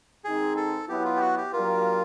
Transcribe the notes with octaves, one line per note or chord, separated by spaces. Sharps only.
G#2 D#3 G#3 C4 D#4 G#4
A4
F#3 B3 E4 G4
F4
G4
F#4
G4
F#3 A#3 D4 F4 G4 A#4